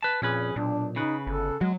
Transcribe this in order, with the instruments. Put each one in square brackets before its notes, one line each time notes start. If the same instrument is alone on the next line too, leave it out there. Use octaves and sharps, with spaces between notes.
[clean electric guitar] B4 A5
[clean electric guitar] F2 C#4 B4 [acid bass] A#2 [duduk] G#4
[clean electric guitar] B1 [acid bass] A#2 [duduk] D4
[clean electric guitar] C#3 B4 [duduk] D#4
[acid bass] G1 [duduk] A4
[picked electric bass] F#3 [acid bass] G#3